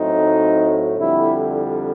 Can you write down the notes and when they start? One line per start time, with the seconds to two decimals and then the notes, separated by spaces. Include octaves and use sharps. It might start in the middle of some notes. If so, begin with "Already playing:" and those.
Already playing: A2 F#3 A3 C4 D#4
0.98 F2 D3 G3 E4